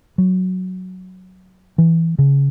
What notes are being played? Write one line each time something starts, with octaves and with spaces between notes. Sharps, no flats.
F#3
E3
C#3